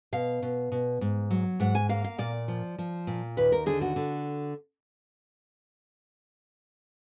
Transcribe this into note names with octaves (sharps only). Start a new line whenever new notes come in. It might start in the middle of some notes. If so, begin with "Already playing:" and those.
B2 F5
B2
B2
G#2
F#3
G#2 F#5
G#5
A#3 F5
F5
A#2 D5
F3
F3
A#2
D#2 B4
A#4
D3 G#4
F#4
D3